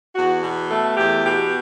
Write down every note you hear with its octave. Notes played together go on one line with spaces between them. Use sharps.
E2 F#4
B2
A3 A4
E2 G4
B2 G4